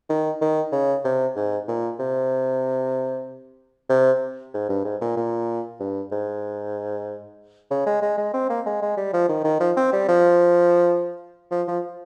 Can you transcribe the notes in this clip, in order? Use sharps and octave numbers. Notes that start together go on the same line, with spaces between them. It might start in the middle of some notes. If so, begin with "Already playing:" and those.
D#3
D#3
C#3
C3
G#2
A#2
C3
C3
G#2
G2
G#2
A#2
A#2
G2
G#2
C#3
G#3
G#3
G#3
C4
A#3
G#3
G#3
G3
F3
D#3
D#3
F3
C4
G3
F3
F3
F3